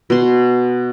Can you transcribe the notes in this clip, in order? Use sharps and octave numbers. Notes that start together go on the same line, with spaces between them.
B2 C6